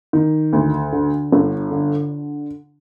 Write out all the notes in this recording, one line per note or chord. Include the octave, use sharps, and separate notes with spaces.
D#3
D2
D3
G1
D3